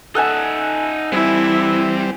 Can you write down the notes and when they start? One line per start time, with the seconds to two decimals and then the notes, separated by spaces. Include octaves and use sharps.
0.15 D#4 A4 E5 F#5 G#5
1.12 E3 G3 C4 E4